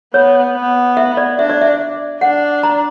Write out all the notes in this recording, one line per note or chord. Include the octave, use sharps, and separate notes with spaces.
B3 C#5
B3
E5
D5
D4 E5
D5
E5
D4 F#5
A#5